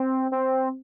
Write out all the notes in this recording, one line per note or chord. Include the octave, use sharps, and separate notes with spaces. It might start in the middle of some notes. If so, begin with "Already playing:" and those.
Already playing: C4
C4